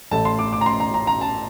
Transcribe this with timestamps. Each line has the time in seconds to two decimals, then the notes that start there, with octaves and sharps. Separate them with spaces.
0.11 A1 A2 A3 A5
0.25 C6
0.39 D6
0.52 D6
0.61 A#5
0.66 C6
0.80 A#5
0.94 A#5
1.07 A#5
1.21 A5